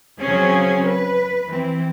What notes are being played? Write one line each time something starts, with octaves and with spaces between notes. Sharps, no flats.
C#3 F#3 C4 C#4 G#4
B4
E3 C4